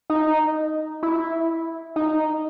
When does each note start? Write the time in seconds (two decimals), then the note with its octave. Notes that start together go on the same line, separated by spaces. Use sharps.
0.10 D#4
1.03 E4
1.96 D#4